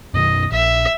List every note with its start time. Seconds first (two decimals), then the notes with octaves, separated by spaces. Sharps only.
0.14 F#2 B2 D#3 D#5
0.52 A#1 E5